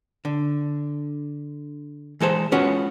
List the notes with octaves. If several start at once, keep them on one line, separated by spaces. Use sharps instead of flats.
D3
E3 G#3 A4 C5
G#3 B3 C#4 F4 F#4